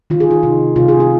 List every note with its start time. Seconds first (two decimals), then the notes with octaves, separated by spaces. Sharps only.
0.10 D#3 F4
0.20 G#4
0.31 F4
0.43 C3 D#4
0.76 C3 F4
0.88 G#4
1.00 F4